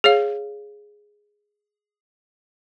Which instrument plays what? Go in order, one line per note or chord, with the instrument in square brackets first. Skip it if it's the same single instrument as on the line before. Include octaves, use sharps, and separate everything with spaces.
[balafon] G#4 C#5 F5